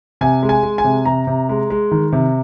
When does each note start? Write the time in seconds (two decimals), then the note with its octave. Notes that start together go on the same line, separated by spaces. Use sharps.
0.21 C3 G#5
0.43 G#3
0.49 G#5
0.63 G#3
0.78 G#5
0.84 C3
1.05 C3 A#5
1.27 C3
1.49 G#3
1.70 G#3
1.91 D#3
2.12 C3